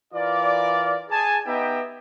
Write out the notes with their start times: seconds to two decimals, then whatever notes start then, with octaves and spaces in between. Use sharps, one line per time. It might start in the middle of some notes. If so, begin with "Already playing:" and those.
0.14 E3 F4 A#4 D5
1.10 G#4 G#5 A5
1.45 B3 D#4 G4 D#5 E5 G5